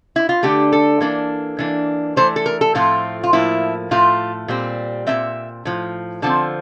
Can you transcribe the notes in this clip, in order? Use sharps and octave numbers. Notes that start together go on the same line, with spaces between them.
E4
F4
D3 A3 D4 G4
A4
E3 A#3 D4
E3 A#3 D4
E3 A3 D4 C5
A4
A#4
A4
A2 F3 A3 C4 F4
F4
A2 F3 A#3 E4
A2 F3 A3 F4
A#2 G3 C4
A#2 A3 C4 E5
A2 F3
D3 F3 C4 A5